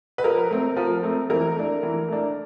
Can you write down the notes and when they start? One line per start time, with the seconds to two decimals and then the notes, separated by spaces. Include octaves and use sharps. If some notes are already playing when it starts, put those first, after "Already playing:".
0.18 B4
0.24 F3 A#4
0.51 A3 C4
0.77 F3
1.03 A3 C4
1.30 E3 A#4
1.56 A3 D4
1.83 E3
2.08 A3 D4